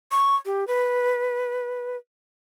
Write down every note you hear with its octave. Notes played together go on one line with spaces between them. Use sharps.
C#6
G4
B4